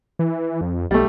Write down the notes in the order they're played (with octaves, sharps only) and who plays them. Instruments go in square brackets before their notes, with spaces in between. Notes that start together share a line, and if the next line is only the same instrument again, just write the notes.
[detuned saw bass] E3
F2
[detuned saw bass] B1 [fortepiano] G3 A3